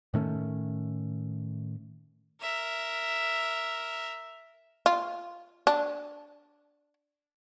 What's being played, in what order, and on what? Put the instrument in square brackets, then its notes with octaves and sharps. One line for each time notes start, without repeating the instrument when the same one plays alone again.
[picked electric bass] A2 D#3 A3 C#4
[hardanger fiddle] A#4 E5
[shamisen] F4
D4